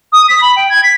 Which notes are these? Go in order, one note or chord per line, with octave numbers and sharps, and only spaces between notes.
D#6
B6
B5
G5
G#6
B6